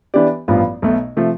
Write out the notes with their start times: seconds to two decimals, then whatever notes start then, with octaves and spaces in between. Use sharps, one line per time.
0.14 E3 B3 D4 G4 D5
0.48 A1 G2 F3 B3 F4
0.82 B1 B2 A3
1.16 C3 F3 A3